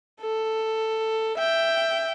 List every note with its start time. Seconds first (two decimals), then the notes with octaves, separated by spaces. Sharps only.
0.21 A4
1.38 E5 G5